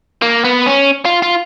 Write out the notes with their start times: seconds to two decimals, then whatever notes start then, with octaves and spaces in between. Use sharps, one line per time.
0.22 A#3
0.44 B3
0.66 C#4
1.05 F4
1.22 F4